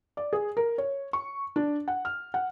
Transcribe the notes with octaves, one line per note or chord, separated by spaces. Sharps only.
D5
G#4
A#4
C#5
C#6
D4
F#5
F6
F#5